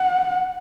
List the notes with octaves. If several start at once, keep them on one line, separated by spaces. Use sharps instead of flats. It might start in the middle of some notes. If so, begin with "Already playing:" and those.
Already playing: F#5